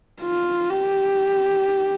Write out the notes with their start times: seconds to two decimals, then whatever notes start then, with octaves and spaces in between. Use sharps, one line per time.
0.21 F4
0.70 G4